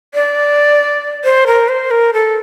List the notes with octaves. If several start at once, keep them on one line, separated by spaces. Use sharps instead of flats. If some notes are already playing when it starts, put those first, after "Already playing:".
D5
C5
A#4
C5
A#4
A4